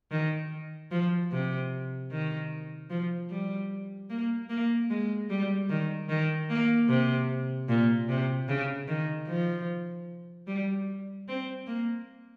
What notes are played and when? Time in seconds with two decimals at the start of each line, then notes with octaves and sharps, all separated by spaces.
0.11 D#3
0.91 F3
1.32 C3
2.11 D#3
2.90 F3
3.30 G3
4.10 A#3
4.50 A#3
4.90 G#3
5.30 G3
5.70 D#3
6.09 D#3
6.50 A#3
6.89 C3
7.69 A#2
8.09 C3
8.48 C#3
8.88 D#3
9.28 F3
10.47 G3
11.28 C4
11.67 A#3